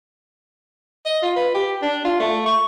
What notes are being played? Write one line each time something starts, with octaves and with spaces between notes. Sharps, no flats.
D#5
F4
B4
G4
D4
F4
A3
C#6